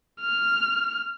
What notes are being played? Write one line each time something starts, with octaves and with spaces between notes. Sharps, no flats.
F6